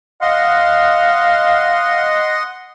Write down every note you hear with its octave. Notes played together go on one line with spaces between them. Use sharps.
D#5 F5 F#5 C6